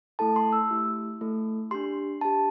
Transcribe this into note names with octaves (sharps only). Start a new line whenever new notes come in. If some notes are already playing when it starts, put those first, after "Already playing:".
A3 E4 A4 A5
C6
E6
A3 E4 G4
A3 E4 A4
D4 G4 C6
D4 G4 A5